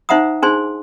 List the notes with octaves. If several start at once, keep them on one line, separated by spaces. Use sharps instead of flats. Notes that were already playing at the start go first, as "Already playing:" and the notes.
D#4 C5 E5 F#5 A#5 D#6
D4 D#4 G#4 C5 G#5 C6